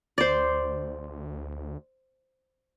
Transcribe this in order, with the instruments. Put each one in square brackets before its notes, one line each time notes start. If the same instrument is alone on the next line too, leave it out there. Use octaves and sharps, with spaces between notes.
[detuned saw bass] D2 [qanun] C5 D5